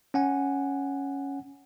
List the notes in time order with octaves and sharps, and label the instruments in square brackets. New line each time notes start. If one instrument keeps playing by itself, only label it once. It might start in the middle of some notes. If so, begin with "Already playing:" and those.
[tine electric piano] C#4 F#5 G#5